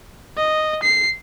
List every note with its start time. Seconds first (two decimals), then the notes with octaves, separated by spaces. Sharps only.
0.38 D#5
0.83 C7